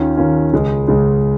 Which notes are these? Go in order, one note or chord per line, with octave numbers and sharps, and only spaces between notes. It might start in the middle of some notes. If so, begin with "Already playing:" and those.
Already playing: D#2 D#3 C#4 F4
D#2 D#3 C#4 F4
C#2 C#3 G#3
C#2 C#3 G#3